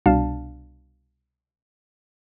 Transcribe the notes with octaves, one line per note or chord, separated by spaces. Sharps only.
C2 B2 D4 F5 A5